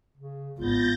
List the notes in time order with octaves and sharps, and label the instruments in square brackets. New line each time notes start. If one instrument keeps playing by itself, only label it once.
[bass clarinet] C#3
[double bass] G#1 [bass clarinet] B3 [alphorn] F4 [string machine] G6 A6 A#6